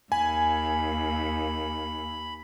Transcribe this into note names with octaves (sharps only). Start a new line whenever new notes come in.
D#2 G#5 B5